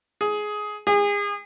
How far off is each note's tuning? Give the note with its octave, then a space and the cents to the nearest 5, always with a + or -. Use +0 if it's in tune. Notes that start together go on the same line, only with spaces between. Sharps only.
G#4 +15
G#4 -30